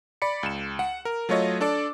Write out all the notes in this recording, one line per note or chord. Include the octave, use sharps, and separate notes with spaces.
D5 B5 C#7
C#2 E7
F#5
A#4
F#3 A3 F4 C#5 D#5
D4 A4 D5 D6